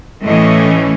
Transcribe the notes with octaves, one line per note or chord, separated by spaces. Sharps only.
A2 E3 A3 C#4 D#5